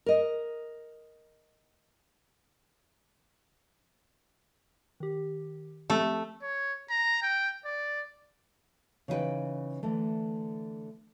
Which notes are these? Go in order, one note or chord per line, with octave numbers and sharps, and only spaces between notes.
A#4 D#5
D#3 G4
F3 A3 C4 G4
C#5
A#5
G5
D5
C#3 E3 D#4 F#4 B4 G5
D3 E3 A3